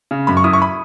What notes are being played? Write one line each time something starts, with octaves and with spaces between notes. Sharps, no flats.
C#3
F#2 B5
C#6
E4 D#6
C#6
B5